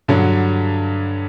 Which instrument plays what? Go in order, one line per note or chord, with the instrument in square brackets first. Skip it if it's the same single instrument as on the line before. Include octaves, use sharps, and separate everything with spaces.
[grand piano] G2 D3 F#3